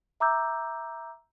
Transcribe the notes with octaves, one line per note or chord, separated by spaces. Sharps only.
E5 A#5 D6 E6 G6